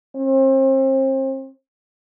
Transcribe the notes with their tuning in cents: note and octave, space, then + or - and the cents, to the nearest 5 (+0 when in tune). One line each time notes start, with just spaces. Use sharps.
C4 +35